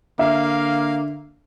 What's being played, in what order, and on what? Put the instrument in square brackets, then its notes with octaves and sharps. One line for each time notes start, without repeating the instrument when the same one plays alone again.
[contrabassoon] D3 [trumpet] A#3 [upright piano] E5 [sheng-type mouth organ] F5